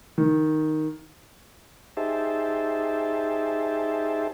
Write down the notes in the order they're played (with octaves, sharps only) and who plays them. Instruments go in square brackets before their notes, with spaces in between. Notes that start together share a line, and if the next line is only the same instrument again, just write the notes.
[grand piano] D#3
[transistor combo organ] D#4 G4 G#4 C5 E5 A5